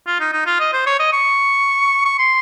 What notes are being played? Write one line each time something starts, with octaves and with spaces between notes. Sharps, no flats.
F4
D#4
D#4
F4
D#5
C5
C#5
D#5
C#6
C#6
C6